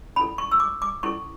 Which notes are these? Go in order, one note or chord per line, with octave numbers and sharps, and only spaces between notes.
C#4 E4 A4 B5
C#6
E6
D6
D6
C#4 E4 A4 C#6